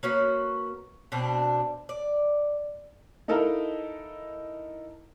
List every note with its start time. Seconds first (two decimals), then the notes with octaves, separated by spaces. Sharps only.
0.03 A#3 C#4 F#4 B4
1.12 B2 C4 D4
1.89 D5
3.28 D#4 E4 A4 A#4 D#5 F5